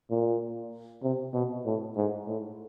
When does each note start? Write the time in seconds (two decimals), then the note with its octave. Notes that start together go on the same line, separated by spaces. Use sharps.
0.10 A#2
1.03 C3
1.34 B2
1.66 A2
1.97 G#2
2.28 A2